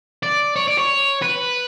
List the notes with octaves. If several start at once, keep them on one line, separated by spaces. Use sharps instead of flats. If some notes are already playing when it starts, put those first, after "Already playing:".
D5
C#5
D5
C#5
B4